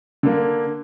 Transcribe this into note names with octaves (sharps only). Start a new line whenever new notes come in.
D3 A#3